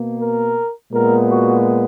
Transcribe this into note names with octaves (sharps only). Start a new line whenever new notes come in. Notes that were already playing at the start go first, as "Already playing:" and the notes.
Already playing: B2 A#3
A#4
A#2 G#3 B3 A#4
F#4